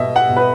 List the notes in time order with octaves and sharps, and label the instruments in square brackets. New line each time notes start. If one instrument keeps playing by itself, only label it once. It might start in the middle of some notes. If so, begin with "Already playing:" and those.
Already playing: [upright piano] B2 D#5 E5
F#5
B2
B4